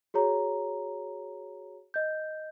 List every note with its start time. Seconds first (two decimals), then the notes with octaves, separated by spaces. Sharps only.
0.14 F#4 G#4 C#5 A#5
1.94 D#5 G6